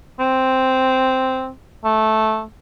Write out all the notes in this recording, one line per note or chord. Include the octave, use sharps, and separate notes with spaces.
C4
A3